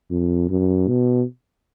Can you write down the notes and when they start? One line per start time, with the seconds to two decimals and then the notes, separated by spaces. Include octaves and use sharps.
0.11 F2
0.50 F#2
0.88 B2